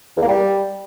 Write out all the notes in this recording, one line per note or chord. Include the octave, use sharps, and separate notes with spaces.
E2
A#3
G3